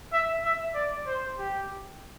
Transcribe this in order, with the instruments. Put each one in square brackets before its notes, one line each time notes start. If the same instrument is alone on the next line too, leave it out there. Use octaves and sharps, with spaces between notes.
[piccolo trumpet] E5
E5
D5
C5
G4